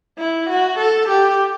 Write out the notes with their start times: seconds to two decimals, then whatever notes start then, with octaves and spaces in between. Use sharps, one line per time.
0.19 E4
0.50 F#4
0.79 A4
1.09 G4